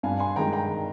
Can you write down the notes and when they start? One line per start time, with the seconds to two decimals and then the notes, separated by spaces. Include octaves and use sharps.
0.03 G2 F5 G#5
0.20 G#5 C6
0.36 D#3 G#3 G5 A#5
0.53 G5 A#5